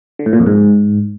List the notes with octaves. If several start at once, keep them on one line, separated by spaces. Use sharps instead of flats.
D3
A2
A#2
F2
G#2